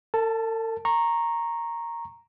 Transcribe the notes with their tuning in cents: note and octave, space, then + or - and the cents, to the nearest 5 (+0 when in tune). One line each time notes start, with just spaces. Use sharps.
A4 +45 A5 +0
A#5 +0 C#6 -25